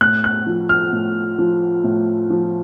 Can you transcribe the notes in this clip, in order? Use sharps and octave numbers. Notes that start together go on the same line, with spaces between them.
A2 F#6
F#6
F3
F6
A2
F3
A2
F3